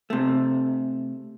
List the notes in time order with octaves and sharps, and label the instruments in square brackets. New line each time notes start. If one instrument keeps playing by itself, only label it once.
[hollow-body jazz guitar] C3 A3